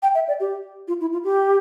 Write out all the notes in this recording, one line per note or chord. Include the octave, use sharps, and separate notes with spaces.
G5
E5
D5
G4
F4
E4
F4
G4